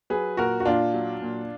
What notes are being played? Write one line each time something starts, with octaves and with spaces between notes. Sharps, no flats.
F#3 G#4 B4
A#2 F#4 A#4
F#4
A#2 D4 F4
F#3
A#2